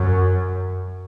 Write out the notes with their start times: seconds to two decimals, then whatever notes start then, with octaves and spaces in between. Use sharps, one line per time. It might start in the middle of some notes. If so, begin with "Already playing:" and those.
Already playing: F#2